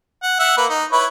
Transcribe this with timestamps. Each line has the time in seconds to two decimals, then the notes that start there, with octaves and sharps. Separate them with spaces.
0.23 F#5
0.39 E5 F#5
0.57 A#3 B4
0.69 D#4
0.92 E4 B4 C#5